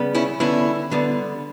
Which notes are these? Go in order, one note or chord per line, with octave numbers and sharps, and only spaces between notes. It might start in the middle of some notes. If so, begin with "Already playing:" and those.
Already playing: C#3 G3 B3
C#4 E4
D3 G3 B3 C#4 E4
D3 G3 B3